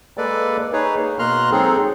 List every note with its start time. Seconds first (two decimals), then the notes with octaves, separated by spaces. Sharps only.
0.18 G#3 A#3 A4 B4 D5
0.73 D#4 G#4 B4 C#5
0.97 A#3
1.19 B2 A#3 A#5 C6 F6 F#6
1.51 F#3 G#3 C4 D#4 G#4 A4